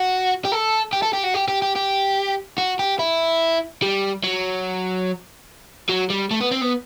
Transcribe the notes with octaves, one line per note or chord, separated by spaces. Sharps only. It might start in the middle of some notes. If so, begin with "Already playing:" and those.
Already playing: F#4
G4
A4
G4
A4
G4
F#4
G4
G4
G4
G4
F#4
G4
E4
G3
F#3
F#3
G3
A3
B3
C4
B3